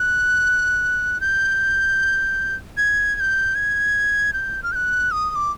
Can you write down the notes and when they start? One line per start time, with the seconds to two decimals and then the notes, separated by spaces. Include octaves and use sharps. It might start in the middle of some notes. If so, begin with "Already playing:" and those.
Already playing: F#6
1.21 G6
2.77 G#6
3.16 G#6
3.20 G6
3.55 G#6
4.33 G6
4.63 F6
4.72 G6
4.75 F#6
5.11 D#6
5.31 D#6
5.35 D6